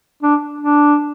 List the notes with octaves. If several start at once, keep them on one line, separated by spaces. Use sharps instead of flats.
D4
D4